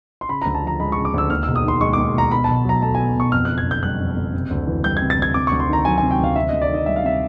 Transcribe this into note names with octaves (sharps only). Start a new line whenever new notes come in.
C6
C#3 B5
D2 A#5
A5
F3 A#5
G#3 B5
C#3 C#6
D6
D2 E6
D#2 F6
E1 E6
D#6
D#3 C6
G#3 C#6
D#2 D6
E1 A#5
B2 B5
B1 A5
F#3 A#5
A3 A5
B2 G#5
B1 C#6
F2 F6
F#1 F#6
G#6
D3 G6
G3 F#6
F2
F#1
C3
D2
E3
G3 G6
C3 G#6
A6
D2 G#6
C3 D6
D2 C#6
C6
D#3 A#5
F#3 G#5
C3 G#5
G5
D2 F5
C3 E5
D2 D#5
D5
D#3 D#5
G3 E5
F5
C3 E5